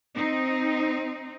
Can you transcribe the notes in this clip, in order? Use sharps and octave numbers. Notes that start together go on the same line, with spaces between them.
C4 D#4